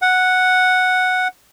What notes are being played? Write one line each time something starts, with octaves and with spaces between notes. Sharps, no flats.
F#5